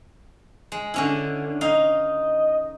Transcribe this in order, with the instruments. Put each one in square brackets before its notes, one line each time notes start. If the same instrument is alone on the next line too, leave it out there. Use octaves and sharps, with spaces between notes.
[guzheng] G#3
D3 C#4 E4
[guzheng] D#4 F5 [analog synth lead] D#5